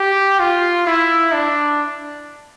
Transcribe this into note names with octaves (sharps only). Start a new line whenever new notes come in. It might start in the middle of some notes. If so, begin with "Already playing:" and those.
Already playing: G4
F4
E4
D4